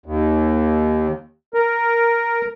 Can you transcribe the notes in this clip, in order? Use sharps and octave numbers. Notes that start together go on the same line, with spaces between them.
D#2
A#4